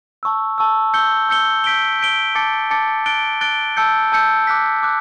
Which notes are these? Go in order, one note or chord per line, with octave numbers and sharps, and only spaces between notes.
A5 C#6 E6
A5 C#6 E6
E6 G6 C#7 G7
E6 G6 C#7 G7
G6 B6 D7 G7
G6 B6 D7 G7
A5 D6 A6 C#7
A5 D6 A6 C#7
F#6 A6 D7 G7
F#6 A6 D7 G7
A5 E6 G6 C#7
A5 E6 G6 C#7
D6 F#6 B6
D6 F#6